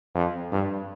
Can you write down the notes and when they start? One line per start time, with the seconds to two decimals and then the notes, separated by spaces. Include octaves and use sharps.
0.15 F2
0.52 G2